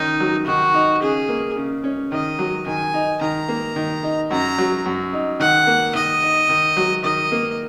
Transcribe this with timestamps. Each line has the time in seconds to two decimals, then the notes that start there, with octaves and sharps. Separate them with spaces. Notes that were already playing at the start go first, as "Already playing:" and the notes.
Already playing: D#3 C#4 D#4
0.20 F#3
0.47 D#3 F#4
0.74 D#4
1.02 C#3 G#4
1.29 A#3
1.56 C#3
1.84 C#4
2.12 D#3 D#5
2.39 F#3
2.66 D#3 G#5
2.94 D#4
3.21 D#3 A#5
3.48 A#3
3.76 D#3
4.03 D#4
4.31 F#2 A#5
4.58 F#3
4.86 F#2
5.13 D#4
5.40 D#3 F#5
5.67 A#3
5.95 D#3 D#5
6.22 D#4
6.49 D#3
6.77 F#3
7.04 D#3 D#5
7.32 A#3